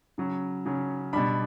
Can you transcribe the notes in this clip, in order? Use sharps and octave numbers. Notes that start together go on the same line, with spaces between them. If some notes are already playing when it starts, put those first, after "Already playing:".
C#3 F#3 C#4
C#3 F#3 C#4
B2 G3 D4 B5